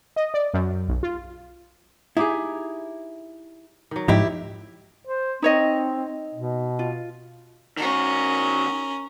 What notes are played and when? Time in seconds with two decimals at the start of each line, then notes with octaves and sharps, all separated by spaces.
0.16 D#5
0.34 D5
0.54 F#2
0.88 B1
1.03 F4
2.17 D#4 E4 G4 G#4
3.91 D#3 F#3
4.08 G#2 F3 D#4 E4 G4
5.07 C5
5.42 C4 D#4 C#5 D#5
6.34 B2
6.79 F4
7.77 D#3 C#4 F#4 A#4